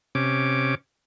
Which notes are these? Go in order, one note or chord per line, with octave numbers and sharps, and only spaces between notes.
C3 C#4 D6